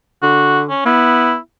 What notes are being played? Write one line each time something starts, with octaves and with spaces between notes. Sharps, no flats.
D3 F#4
C#4
B3 E4